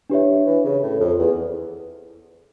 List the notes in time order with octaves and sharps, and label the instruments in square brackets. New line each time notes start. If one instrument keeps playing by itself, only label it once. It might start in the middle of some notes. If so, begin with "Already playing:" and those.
[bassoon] E3 [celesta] D4 G4 C#5 E5
[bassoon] E3
C#3
A2
F2
E2